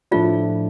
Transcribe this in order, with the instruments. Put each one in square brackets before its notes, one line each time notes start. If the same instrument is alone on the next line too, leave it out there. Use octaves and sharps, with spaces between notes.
[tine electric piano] A2 F3 A3 D4 [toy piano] F4